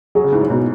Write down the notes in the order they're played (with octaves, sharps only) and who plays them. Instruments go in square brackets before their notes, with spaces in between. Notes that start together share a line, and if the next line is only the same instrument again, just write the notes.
[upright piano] F#3 [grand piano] G#4
[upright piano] C#3
[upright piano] G#2 [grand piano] E4
[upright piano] F#2
[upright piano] G#2 [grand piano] B2